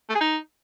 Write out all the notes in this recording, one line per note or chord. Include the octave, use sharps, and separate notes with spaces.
A3
G#4
D#4